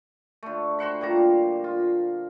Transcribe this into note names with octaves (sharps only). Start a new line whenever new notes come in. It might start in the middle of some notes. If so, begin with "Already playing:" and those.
D3 A3
F#4 C5 F#5 B5
A#2 G3 A#5
F4